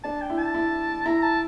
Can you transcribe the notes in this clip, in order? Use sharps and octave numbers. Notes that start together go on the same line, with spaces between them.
D4 A5
G5
E4
A5
E4
E4 A#5
A5